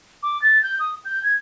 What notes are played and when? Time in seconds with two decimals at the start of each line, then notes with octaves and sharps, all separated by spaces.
0.23 D6
0.42 A6
0.63 G6
0.79 D#6
1.05 G6
1.23 G#6